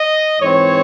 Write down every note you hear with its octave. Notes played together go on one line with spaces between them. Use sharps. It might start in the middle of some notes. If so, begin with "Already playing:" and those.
Already playing: D#5
G#2 E3 C4 C#5